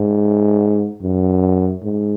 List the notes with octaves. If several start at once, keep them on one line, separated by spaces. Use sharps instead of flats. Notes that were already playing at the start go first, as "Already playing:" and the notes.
Already playing: G#2
F#2
G#2